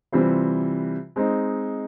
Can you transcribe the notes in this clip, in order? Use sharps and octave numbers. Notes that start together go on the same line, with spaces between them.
C3 E3 G3 C4 F4
G#3 C4 D#4